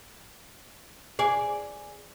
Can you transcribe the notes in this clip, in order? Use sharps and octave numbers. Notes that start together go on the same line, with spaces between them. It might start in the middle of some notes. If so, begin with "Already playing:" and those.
G#4 D5